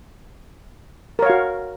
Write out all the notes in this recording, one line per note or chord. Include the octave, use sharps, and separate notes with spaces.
F#4 A#4 C#5 F5